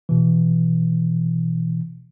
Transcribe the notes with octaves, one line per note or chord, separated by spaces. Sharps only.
B2 E3